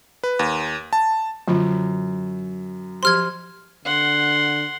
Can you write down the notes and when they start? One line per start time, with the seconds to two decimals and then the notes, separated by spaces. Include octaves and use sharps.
0.24 B4
0.39 D#2
0.93 A5
1.48 F#2 D3 F4 B5
3.03 F3 G4 C5 C6 F6 G#6
3.85 D3 F#5 C6